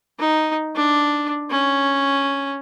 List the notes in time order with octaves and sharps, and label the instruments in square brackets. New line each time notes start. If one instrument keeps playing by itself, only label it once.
[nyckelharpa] D#4
D4
C#4